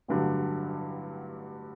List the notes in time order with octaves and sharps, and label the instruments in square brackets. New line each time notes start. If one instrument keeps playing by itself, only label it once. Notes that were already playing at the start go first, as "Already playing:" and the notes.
[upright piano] A1 G2 D3 F#3